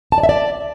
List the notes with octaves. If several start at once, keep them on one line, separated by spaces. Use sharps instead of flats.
A5
D5
E5
D5